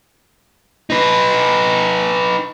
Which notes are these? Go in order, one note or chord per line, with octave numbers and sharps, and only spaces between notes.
D#4 B4